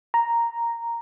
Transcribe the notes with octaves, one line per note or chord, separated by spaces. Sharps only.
A#5